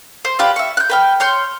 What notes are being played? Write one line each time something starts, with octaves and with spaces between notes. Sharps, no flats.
C5
F4 G4 B4 D5
E5 C#6
F#6 G6
B4 G5 F6
C#5 C6 F6 G6